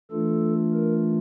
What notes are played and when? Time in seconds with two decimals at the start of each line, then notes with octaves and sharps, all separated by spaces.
0.11 E3 A3 D4 F4 A4
0.73 A#4